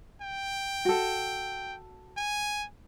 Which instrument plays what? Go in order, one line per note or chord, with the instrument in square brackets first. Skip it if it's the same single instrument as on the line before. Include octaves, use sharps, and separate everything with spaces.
[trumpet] G5
[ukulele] F#4 A4
[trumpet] G#5